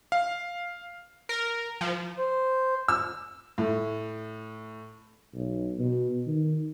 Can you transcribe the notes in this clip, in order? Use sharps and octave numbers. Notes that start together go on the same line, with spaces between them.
F5
A#4
F3
C5
E6
A2
B1
B2
D#3